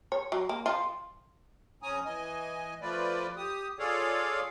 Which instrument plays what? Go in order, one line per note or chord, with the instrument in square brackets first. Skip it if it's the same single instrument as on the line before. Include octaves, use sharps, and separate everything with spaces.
[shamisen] C#5
F#3
A#3
F3 F4
[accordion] F2 C#4 G#5 A#5 D#6
E3 D#5 G#5
F3 A3 F4 B4 D5
G4 D#6
F4 G#4 A4 C#5 D5 F5